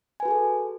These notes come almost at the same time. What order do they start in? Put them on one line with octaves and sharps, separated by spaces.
G#5 B4 F#4 G#4 A4